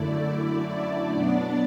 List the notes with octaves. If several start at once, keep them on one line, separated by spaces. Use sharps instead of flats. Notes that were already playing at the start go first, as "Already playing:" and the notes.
Already playing: F#2 D3 A3 E4 D5
B2 F#3 B3 D4